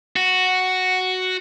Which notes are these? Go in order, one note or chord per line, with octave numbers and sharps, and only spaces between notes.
F#4